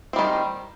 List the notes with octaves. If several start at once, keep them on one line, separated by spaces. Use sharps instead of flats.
D#3 G3 C4